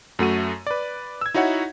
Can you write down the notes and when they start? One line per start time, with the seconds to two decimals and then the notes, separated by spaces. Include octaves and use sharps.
0.19 F#2 A3 F#4 D#7
0.67 B4 D5
1.21 E6 G#6
1.34 D#4 E4 F#4 C#5 E5 F#5